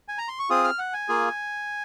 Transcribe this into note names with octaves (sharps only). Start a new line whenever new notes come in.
G#5
A#5
C6
C#6
C4 F4 G#4 D#6
F6
F#5
G#5
A#3 F4 G#4